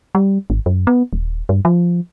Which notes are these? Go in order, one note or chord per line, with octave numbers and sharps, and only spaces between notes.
G3
G#1
F#2
B3
D#1
G2
F3